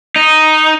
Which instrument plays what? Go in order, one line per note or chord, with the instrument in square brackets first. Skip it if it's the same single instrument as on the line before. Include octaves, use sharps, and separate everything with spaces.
[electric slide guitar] D#4